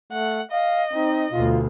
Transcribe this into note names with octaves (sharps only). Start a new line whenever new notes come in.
A3 F#5
D#5 F5
C4 D#4
D2 B2 F4